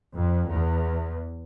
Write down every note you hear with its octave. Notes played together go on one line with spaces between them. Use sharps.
F2
E2